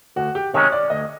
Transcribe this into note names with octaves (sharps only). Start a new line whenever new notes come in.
D2 F#4
G4
C3 D#3 G#3 C#4 C#5
D5
D2 D#5